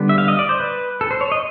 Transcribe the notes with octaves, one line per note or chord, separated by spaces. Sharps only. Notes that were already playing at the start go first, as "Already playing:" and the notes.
Already playing: D3 G3 B3
E5
F5
D#5
D5
C5
B4
A4
C5
C#5
D#5